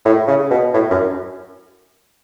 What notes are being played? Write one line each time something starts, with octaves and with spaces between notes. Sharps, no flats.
A2
C#3
B2
A2
F#2